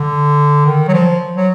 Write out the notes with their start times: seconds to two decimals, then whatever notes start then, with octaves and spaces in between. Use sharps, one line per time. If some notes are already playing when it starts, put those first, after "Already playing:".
Already playing: D3
0.66 D#3
0.88 F#3
0.94 F3
1.37 F#3